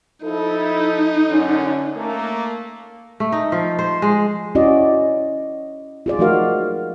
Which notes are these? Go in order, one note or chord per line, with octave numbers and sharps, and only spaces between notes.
F3 D#4 E4 A4
F#2 D3 C#4
A3 A#3
A3
D#4
F3
C5
G#3
C#4 E4 F#4 D5 D#5
F4 G#4 D5
F3 A3 D#4 F#4 A#4 F5